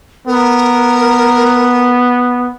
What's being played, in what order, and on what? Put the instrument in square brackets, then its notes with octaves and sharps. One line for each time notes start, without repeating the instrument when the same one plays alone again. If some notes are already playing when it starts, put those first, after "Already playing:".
[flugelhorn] B3 [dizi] A#4